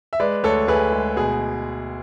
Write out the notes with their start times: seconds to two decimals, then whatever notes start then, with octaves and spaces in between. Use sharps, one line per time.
0.13 E5
0.20 G#3 B4 D5
0.44 D2 A4 C#5
0.68 D2 G#4 B4
0.92 G#3
1.16 B2 G#4